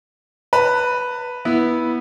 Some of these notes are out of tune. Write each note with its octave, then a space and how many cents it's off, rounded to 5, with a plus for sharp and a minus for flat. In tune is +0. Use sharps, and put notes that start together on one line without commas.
B4 +0 A5 +45
B3 -10 E4 -10